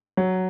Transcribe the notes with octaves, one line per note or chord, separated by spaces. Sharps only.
F#3